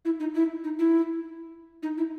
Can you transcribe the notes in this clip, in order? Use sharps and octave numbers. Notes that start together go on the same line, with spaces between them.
E4
D#4
E4
D#4
E4
D#4
E4